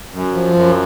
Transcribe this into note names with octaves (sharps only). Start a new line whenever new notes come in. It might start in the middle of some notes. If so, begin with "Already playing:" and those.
F#2
F3
F#2